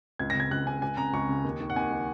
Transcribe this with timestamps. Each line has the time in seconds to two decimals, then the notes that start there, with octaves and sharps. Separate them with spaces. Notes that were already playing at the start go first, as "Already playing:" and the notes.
0.19 C#2 G#6
0.30 A#6
0.35 C#3 G#6
0.51 C#2 F#6
0.67 C#3 G#5
0.82 C#2 G#5
0.97 C#3 A#5
1.13 C#2 C#6
1.29 C#3
1.44 D#2
1.60 D#3
1.70 F#5
1.76 D#2 G#5
1.91 D#3